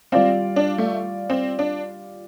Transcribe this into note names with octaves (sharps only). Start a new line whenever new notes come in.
G3 C4 F4 D5 F5
D4
A3
C4
D4